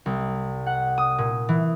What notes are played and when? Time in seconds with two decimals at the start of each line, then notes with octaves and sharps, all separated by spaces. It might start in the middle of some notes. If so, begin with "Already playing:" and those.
0.06 C2
0.66 F#5
0.98 D#6
1.18 A#2
1.49 E3